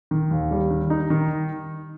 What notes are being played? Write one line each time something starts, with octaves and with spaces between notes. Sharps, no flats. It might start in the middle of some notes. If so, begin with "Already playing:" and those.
D#3
D#2
G3
D#3
D#4
D#3